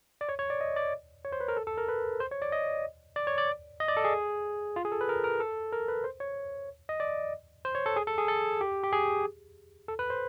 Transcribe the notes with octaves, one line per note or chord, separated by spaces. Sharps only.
D5
C#5
C#5
D5
D#5
D5
C#5
C5
B4
A#4
A4
A4
A#4
B4
C5
C#5
D5
D#5
D5
C#5
D5
D#5
D5
A4
G#4
F4
G#4
A4
B4
A#4
A#4
A4
A#4
B4
C5
C#5
D#5
D5
C5
C#5
A4
G#4
A4
G#4
A4
G4
G4
G#4
A4
B4
C5